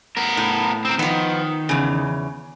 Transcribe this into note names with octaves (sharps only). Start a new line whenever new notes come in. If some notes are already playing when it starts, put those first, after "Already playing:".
B3 A#4
A2
C4 A#4
D#3 F3 B3
E2 C#3